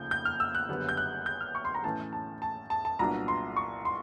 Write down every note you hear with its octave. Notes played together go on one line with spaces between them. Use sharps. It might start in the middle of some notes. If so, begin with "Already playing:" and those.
Already playing: F1 D#2 C#3 F3 A#3 G6
G6
F6
E6
F#6
F#1 F#2 D3 G3 B3
G6
F#6
G6
F6
C#6
C6
A#5
A2 E3 A3 C#4 A5
A5
A5
A5
A5
C2 A#2 F#3 B3 D4 A#5
C6
C#6
C6